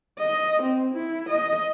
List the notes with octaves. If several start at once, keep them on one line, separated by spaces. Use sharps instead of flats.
D#5
C4
E4
D#5